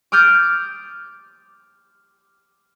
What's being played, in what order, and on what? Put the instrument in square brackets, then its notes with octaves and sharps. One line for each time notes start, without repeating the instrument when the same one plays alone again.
[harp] D6 D#6 F6 G6 A6 D7